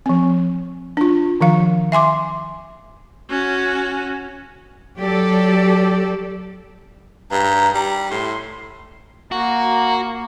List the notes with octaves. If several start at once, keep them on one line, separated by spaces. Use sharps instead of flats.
F3 C4
D4 F4
D#3 F3 F5
E5 G#5 C6 D6
C#4 F#4
F#3 G4 A4 D5
G2 A#5
G3
A2 C6
A#3 F#4